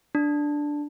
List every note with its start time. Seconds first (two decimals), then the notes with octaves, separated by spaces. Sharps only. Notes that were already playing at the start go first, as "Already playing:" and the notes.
0.15 D4